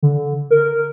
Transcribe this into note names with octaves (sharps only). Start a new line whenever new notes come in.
D3
A#4